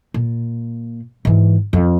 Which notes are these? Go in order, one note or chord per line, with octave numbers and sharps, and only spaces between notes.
A#2
G#2 E3
F2